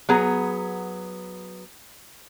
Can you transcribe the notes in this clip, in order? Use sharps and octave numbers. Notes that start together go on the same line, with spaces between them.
F#3 B3 G#4 A#5